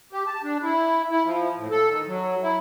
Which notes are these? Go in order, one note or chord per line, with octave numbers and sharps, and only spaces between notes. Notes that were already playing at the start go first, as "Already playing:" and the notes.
G4
A5
D4
E4
E4
F3
A2
A4
D#3
F#3
E4